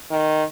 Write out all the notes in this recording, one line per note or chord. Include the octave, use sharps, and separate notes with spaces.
D#3